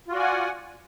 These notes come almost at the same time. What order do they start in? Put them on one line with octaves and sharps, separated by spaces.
F4 F#4 D5 G#5 F#5